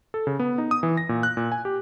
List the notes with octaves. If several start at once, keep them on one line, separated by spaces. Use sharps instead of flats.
A4
C#3
B3
D#4
D#6
E3
A#6
A#2
F#6
A#2
G#5
G4